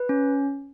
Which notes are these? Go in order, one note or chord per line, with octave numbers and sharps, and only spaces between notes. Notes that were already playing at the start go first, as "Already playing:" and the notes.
Already playing: B4
C#4